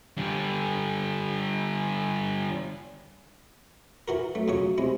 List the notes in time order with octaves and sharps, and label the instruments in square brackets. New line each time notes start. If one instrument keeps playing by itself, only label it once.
[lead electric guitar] D3 G3
[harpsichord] E3 F#4 A#4
[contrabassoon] F#3 [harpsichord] A3
[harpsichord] F2 C#3 C#5
[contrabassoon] C3 [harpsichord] G#3 E4